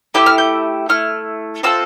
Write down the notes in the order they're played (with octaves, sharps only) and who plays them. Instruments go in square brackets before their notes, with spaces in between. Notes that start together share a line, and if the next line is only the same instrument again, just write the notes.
[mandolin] A3 E4 G4 G6
F6
G6
A3 E4 F6
C4 F4 A4 E6